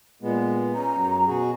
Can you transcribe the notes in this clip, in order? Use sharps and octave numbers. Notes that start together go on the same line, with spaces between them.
A#2 G#3 B3
C#4 A#5
F#2 F#3
B2 F#4 G#4